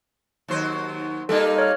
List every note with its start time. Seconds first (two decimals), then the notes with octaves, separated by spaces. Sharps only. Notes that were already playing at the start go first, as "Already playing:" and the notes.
0.48 D#2 F#3 C5
1.29 G3 A#3 D#4 A4
1.58 C#5 F6